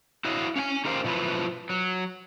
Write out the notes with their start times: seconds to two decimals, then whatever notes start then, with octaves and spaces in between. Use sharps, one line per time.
0.25 E4 F#4 C#5 D#5 F5
0.56 C#4 F5 G#5
0.85 D#4 G4 A#4 C5 F5 G5
1.04 B2 F3 F#3 E4 B4
1.69 F#3